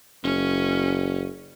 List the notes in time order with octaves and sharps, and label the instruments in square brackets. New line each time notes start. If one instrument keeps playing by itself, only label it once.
[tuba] F#1 [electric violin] C#4